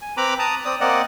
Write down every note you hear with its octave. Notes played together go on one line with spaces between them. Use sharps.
G#5
C4 B4 A#5 B5 D6
A5 A#5 D#6
C4 D5 D#6
A#3 C4 D5 D#5 F#5